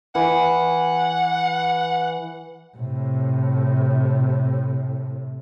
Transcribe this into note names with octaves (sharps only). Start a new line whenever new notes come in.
E3 F#5
A2 C3